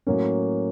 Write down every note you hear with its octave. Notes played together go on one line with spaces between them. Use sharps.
A2 F#3 A#3 C#4